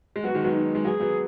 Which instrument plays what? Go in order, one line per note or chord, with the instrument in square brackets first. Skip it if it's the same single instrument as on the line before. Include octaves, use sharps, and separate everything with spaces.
[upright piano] G#3
[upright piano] F#3 B3 [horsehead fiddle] F#4
[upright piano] D#3 G#3
F#3 B3
[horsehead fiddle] D#4
[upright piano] G#3
[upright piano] F#3 B3 [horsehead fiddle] G#4
[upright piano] F#3 B3